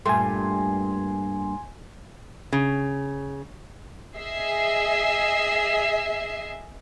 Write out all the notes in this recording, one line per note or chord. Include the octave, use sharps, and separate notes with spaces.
G2 A#2 A3 G#5 C6
C#3
G#4 D#5 E5 C7